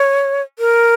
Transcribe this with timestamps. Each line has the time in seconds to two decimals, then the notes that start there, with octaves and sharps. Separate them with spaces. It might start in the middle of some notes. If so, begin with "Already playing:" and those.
Already playing: C#5
0.59 A#4